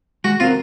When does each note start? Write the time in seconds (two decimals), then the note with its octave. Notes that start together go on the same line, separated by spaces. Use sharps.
0.24 G#3 F#4
0.40 C4 F4 F#4 A#4